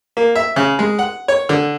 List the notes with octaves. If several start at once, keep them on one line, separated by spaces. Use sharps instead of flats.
A#3
E5
C#3
G#3
F#5
C#5
D3